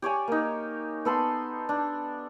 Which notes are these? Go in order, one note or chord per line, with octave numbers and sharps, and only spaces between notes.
G4 C#5 D5 G#5
A#3 D#4
B3 A4 B5 C6
D4